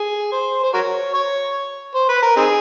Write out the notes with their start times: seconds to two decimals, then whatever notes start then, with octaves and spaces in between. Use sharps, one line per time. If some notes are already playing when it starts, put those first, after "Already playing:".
Already playing: G#4
0.32 C5
0.63 C5
0.74 F#4 A#4 C#5
1.14 C#5
1.95 C5
2.09 B4
2.22 A#4
2.37 C4 D#4 G#4